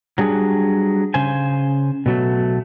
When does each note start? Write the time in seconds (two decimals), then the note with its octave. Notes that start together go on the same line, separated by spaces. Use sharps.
0.18 F#3 G3 D4 G#4
1.14 C#3 C5 G#5
2.06 B2 F#3 A3